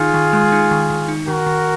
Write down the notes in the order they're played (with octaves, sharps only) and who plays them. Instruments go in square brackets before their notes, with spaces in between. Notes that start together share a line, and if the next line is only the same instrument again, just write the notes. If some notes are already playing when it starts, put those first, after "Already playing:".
Already playing: [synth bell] D#3 D#4 [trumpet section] F4 G#4
[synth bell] D#3
G#3
D#4
D#3
D#3
D#4
[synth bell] D#3 [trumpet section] F#4 A#4
[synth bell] D#3